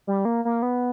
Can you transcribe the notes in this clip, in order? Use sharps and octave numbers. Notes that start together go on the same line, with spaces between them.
G3
A#3
A#3
B3